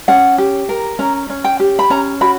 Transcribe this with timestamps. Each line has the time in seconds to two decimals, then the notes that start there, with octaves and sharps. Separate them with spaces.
0.08 C#4 F#5
0.38 G4
0.69 A#4
0.99 C#4 A#5
1.30 C#4
1.44 G5
1.60 G4
1.79 B5
1.90 C#4 A#5
2.21 F#4 B5